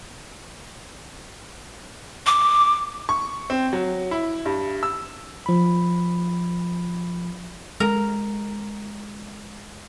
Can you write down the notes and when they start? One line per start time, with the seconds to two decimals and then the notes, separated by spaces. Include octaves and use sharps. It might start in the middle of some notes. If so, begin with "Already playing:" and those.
2.26 D6
3.09 C#6
3.50 C4
3.73 F#3
4.11 E4
4.46 G2
4.83 E6
5.46 F3 B5
7.80 G#3 A#4